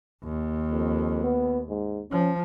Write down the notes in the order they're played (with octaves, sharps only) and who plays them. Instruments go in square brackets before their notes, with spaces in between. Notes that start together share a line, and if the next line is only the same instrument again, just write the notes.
[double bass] D#2
[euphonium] F2
B3
G#2
[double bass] F3 [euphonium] C#4